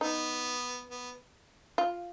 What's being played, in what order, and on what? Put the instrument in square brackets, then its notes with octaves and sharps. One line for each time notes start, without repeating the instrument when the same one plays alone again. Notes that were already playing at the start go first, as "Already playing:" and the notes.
[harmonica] B3 [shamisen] D#4
[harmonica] B3
[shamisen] F4